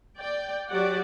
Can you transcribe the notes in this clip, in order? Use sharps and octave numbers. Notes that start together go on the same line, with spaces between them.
D5 G5
F#3 F#4 G4 D5 F#5